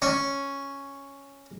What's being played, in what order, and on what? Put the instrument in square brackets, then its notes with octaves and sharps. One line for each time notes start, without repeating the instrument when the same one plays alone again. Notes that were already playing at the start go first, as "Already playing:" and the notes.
[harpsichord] C#4